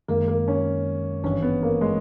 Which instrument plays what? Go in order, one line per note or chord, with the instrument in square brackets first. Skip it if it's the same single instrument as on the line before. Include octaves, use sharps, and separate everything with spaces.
[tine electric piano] F#2 D#3 G#3 [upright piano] A#3
[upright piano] A#3
C#4
[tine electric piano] G#1 G2 E3 [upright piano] C#4
[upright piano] B3
A#3
G#3